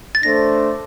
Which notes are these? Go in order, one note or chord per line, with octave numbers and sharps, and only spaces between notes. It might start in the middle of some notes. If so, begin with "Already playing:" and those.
A6
A3 D4 A4 C5 A#6